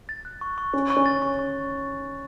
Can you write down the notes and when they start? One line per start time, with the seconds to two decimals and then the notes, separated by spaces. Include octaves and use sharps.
0.09 A6
0.25 F#6
0.41 C#6
0.58 C#6
0.73 C#4 C#6
0.90 C#6
0.97 C#4
1.06 A6
1.22 C#6
1.39 C#6